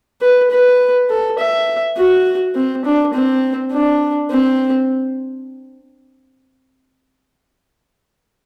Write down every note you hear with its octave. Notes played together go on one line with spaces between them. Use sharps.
B4
B4
A4
E5
F#4
C4
D4
C4
D4
C4